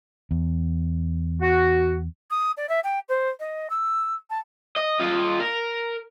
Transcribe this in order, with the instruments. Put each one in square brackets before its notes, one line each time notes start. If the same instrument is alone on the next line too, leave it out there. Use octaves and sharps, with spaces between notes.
[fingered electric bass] E2
[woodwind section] F#4
[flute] D#6
D5
E5
G5
C5
D#5
E6
A5
[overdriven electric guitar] D#5
F4 D#5
A#4